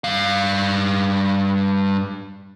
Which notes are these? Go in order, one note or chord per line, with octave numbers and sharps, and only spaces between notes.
G2 F5